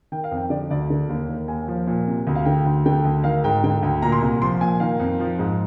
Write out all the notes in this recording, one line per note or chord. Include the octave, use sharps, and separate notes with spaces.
D#3 G5
F5
F2
G5
D3 D5
D2 D5
D3
D#2
D#3
D#2 G#5
F3
A#2
C3
D2
F5
D3 G5
D2
D3 G5
D2
D#3 F5
G#2 G5
D3 G5
D2 G5
A#2 A#5
C6
C2
F3 C6
A#2 G#5
D#3 F5
F2
F3
G#2